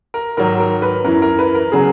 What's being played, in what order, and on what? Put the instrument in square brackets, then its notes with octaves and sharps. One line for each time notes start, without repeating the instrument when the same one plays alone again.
[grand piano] A#4
G#2 D#3 F#3 A#4
A#4
B4
F#2 E3 A#4
A#4
B4
A#4
C#3 F#3 G#4